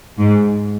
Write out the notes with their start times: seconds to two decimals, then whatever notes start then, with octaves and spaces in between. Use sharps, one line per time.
0.18 G#2